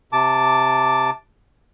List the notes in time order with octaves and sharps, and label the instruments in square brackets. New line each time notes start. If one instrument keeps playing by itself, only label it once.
[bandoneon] C3 A5 D6